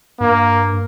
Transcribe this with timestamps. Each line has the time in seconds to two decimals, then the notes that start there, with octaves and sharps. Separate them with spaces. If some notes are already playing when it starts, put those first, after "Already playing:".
0.20 G2 A#3